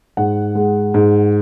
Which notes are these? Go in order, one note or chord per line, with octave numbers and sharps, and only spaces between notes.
G#2 F#5
G#3
G#2